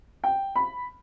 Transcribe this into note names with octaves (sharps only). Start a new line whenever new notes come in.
G5
B5